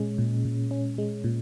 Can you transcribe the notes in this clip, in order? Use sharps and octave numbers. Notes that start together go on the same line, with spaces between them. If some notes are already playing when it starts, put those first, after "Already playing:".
Already playing: A#2 G#3 C#4
A#2
A#2
C#4
G#3
A#2